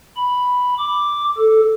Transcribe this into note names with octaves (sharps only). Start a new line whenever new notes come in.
B5
D6
A4